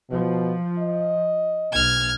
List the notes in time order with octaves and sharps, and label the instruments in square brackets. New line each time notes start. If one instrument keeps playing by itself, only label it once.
[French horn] B2 [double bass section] F3
[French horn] D#5
[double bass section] B1 [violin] F6 G#6